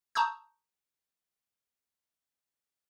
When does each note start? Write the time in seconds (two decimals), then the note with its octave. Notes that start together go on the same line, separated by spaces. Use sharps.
0.15 A5 A#5 C#6 D#6 E6 G6